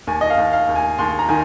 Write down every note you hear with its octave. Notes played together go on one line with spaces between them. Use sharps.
D#2 G#5
D#5
F5
D#2
F5
D#2
G#5
D#2 C6
A#5
D#3 G#5